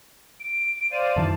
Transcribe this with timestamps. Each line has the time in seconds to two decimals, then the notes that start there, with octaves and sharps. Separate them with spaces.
0.40 D7
0.92 C5 D5 F5 D#7
1.16 F#2 D#3 E3 A5